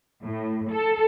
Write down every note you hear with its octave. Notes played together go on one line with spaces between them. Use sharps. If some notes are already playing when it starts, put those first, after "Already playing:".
A2
A4